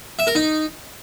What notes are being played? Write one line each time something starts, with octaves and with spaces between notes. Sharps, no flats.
E5
A#4
D#4